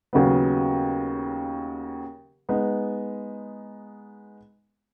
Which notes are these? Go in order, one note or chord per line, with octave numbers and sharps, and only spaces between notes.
D#2 C#3 F#3 B3
G#3 B3 D#4